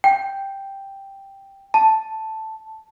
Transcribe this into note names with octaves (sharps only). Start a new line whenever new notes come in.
G5
A5